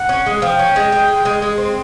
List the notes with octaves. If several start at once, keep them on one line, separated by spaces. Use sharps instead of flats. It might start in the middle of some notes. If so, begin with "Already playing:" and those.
Already playing: F#5
C#4
G#3
F3 G5
C#4
G#3
G#3
G#3
G#3
G#3
C4